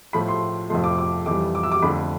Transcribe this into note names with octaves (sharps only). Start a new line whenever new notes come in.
A2 F3 A3 B5
C6
F2 C3 F3 A3 C6
D6
D6
F2 E3 G3 D6
D6
E6
D6
F2 D3 A3 B5